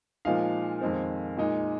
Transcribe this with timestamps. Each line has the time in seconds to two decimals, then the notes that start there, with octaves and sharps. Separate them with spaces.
0.25 A#2 F3 G#3 D#4 F5
0.81 F2 D#3 G#3 C4
1.37 A#2 G#3 D#4